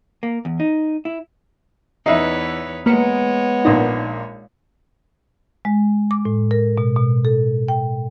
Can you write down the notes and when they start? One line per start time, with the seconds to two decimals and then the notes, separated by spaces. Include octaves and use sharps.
0.23 A#3
0.45 E2
0.60 D#4
1.05 E4
2.06 E2 D#4 B4 C#5 E5 C7
2.86 G#3 A#3 B3 B4 C#5 C#7
3.65 A#1 A#2 D4 D#4
5.65 G#3
6.11 D6
6.25 A2
6.51 A#4
6.78 B2
6.96 B2
7.25 A4
7.68 G5